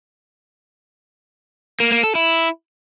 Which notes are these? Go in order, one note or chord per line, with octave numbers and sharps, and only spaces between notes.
A#3
A#3
A4
E4